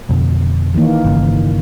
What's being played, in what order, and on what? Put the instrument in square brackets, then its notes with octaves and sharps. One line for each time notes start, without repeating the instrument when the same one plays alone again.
[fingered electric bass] F2 B2 D3
[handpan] D#3 E3 A#3
[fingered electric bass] G1 C#3